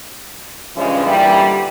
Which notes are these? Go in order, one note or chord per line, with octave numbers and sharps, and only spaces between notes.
G2 C#3 E3 F3 G#3 C#4
A#2 D3 E3 G3